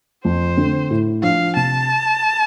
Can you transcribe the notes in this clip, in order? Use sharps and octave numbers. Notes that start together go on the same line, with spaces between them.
F2 C5
D3 A3 C4
A2
F3 D4 F5
C3 A5